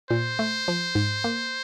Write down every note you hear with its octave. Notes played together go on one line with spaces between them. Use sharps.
A#2 C5
A3
F3
G#2
A#3